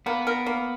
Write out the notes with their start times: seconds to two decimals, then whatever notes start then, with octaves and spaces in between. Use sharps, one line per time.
0.06 A#3 B3
0.27 A#4
0.46 A#3